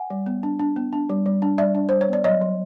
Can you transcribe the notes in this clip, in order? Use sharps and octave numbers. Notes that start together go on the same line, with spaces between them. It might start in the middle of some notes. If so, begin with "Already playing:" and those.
Already playing: F#5 G#5
G3
B3
D4
D4
B3
D4
G3
G3
D4
G3 D5 E5
D4
G3 C5
C#5
B3 D5
F#3 C#5 D#5
F#3